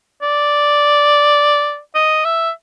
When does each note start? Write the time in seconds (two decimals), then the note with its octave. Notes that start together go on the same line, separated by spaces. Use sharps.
0.22 D5
1.95 D#5
2.25 E5